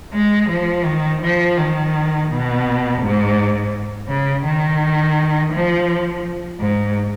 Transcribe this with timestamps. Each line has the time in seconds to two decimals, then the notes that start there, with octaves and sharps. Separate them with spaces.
0.14 G#3
0.49 F3
0.85 D#3
1.22 F3
1.57 D#3
2.30 B2
3.02 G#2
4.08 C#3
4.45 D#3
5.53 F3
6.60 G#2